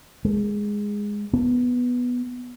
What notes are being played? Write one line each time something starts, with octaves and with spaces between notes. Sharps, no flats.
G#3
B3